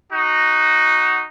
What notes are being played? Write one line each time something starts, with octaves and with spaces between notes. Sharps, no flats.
D#4 F#4